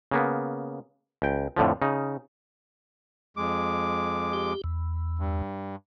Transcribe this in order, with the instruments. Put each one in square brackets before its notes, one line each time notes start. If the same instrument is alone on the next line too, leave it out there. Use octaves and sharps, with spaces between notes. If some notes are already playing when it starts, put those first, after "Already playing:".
[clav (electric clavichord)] C#3 A#3 B3
C#2 G5
F2 A2 D3 F3
C#3 D#4
[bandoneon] F2 G#3 D6
[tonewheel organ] G4
E2
[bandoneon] G2